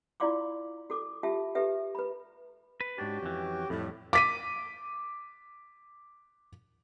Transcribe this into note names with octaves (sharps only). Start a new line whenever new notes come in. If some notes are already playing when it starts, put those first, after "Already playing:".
E4 F4 D5 F5 C6 D6
F#4 A4 D6
F4 G4 E5 A5
G4 A4 B4 E5
B4 B5
B4
G#2 C#4 D4 F#4 G4
F2 E3
F2 A2 G3
D6 B6 D#7